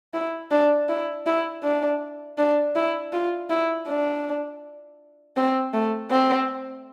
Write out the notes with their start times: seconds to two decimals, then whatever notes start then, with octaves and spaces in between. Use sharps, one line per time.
0.14 E4
0.51 D4
0.89 E4
1.26 E4
1.63 D4
2.38 D4
2.76 E4
3.12 F4
3.50 E4
3.87 D4
5.37 C4
5.74 A3
6.11 C4